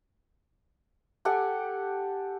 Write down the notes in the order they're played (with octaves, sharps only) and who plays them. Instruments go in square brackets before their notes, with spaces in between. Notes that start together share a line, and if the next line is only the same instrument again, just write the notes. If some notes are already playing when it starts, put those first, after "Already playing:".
[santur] G4 A4 F#5 G#5